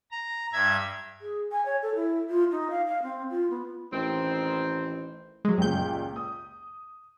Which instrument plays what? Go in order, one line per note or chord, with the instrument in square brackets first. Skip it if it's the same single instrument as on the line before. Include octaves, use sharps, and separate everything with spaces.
[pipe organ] A#5
G2 E5 G#6
[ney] G#4
G#5
C#5
A4
E4
F4
D#4
F5
F5
C4
F4
B3
[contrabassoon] A1 [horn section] D#3 C4
[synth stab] F#3 G#3
[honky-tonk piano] C#2 A#2 G4 [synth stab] F#2 G6
[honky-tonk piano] D#6